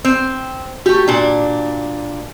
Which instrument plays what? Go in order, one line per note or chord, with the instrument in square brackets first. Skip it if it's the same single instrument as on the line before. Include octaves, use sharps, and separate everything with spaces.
[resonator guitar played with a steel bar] C4
[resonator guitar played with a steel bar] A3 G4 [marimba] F#4
[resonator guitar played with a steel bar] A#2 D4